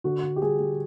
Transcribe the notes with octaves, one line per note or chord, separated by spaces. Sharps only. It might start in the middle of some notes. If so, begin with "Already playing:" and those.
D3 F#4
D3
G4
G3 G#4
G3